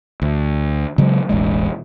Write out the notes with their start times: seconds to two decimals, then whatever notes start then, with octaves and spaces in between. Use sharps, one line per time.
0.22 D2
0.98 C#3 F#3 G#3
1.29 E1 A1 G#3